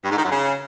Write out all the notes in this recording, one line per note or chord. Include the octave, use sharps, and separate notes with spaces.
G2
G#2
D#3
F#2
C#3